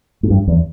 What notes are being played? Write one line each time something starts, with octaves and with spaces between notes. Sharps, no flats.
G#2
G2
E2